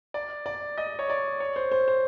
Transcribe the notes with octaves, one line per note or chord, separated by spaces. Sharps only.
D5
D5
D#5
C#5
D5
C#5
C5
C5
C5